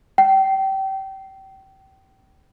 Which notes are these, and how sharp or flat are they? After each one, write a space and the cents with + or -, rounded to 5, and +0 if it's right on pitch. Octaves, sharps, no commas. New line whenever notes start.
G5 -30